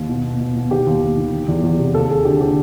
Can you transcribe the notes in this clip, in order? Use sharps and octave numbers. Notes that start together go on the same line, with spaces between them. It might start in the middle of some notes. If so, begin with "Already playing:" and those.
Already playing: D#2
B2
B2
B2
B2
D#3 G4
D#2
D#2
D#3
D#3
E2
E2
C3
D#2 A4
D#2 G#4
D3 G4
D3 G4